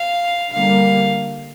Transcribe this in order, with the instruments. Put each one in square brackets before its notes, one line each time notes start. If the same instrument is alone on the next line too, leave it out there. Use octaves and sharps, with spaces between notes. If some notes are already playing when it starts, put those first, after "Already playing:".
Already playing: [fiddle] F5
[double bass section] D3 G3 A#3 [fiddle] F5